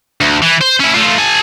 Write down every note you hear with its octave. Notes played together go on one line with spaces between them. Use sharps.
D2
E3
C5
C#4 E4
A3 F4
A4 G#5